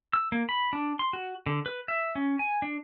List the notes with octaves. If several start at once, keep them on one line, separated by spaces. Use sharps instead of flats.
E6
A#3
B5
D4
C6
F#4
D3
B4
E5
C#4
G#5
D4